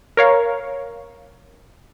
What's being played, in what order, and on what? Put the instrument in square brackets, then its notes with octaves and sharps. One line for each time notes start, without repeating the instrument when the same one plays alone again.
[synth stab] A#4 C#5 F5